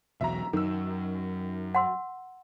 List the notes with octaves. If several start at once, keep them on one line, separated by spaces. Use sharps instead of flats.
B1 E2 F#3 E5 A#5
F#2 D#3 E6
F#5 C6 E6